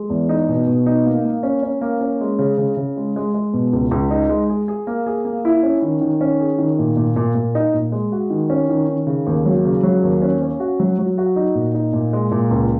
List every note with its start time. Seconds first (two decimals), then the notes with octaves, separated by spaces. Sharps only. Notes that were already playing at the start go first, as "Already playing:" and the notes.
Already playing: G#3
0.10 E2
0.29 D#4
0.48 B2
0.67 B2
0.86 D#4
1.06 A#3
1.25 A#3
1.43 C#4
1.63 C#4
1.81 A#3
2.01 C#4
2.21 G#3
2.39 C#3
2.58 C#3
2.77 C#3
2.97 G#3
3.16 G#3
3.34 G#3
3.53 B2
3.73 C#2
3.91 C#2
4.11 D#4
4.29 G#3
4.50 G#4
4.68 G#4
4.87 A#3
5.07 G#4
5.25 A#3
5.45 E4
5.63 C#4
5.82 D#3
6.01 D#3
6.21 C#4
6.40 G#4
6.58 D#3
6.79 A#2
6.97 A#2
7.16 A#2
7.35 A#2
7.55 D#4
7.74 A#2
7.92 G#3
8.12 F#4
8.30 D#3
8.50 C#4
8.69 D#3
8.89 D#3
9.07 C#3
9.27 D#2
9.46 F#3
9.65 C#3
9.83 F#3
10.03 D#2
10.22 C#4
10.41 C#4
10.60 F#4
10.80 F#3
10.99 F#3
11.18 F#4
11.36 D#4
11.55 A#2
11.74 D#4
11.93 A#2
12.13 G#3
12.32 A#2
12.51 C#2